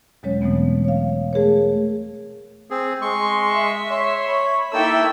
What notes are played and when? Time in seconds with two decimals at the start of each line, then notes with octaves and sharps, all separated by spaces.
0.23 E2 B2 F#3 G#3 C#4 C#5
0.41 B2 E3 F#3 A3 B3 C4
0.85 C#5 F5
1.33 A3 G#4 A#4 C#5
2.70 C4 G#4
3.02 G#3 C6 C#6
3.52 E5
3.91 C#5 C6
4.28 B5
4.73 A#3 D#4 E4 A4 E5 G5 E6